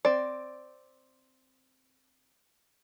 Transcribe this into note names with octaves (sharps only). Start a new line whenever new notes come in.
C4 D5